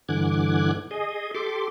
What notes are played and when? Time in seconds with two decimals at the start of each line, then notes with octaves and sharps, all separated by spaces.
0.09 G2 D3 E3 D6 F#6 G#6
0.91 G#4 D#5
1.34 G4 A4 C6 D6